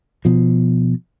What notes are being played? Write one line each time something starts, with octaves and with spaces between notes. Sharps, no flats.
B2 F3